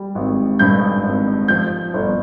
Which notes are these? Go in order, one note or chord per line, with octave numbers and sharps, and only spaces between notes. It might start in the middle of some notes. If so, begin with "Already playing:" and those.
Already playing: G3
G#1
G2 G6
G#1
F3 G6
G1